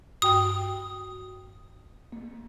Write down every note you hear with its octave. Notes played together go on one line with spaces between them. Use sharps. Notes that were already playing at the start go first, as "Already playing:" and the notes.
G2 F#4 G5 D#6
A#3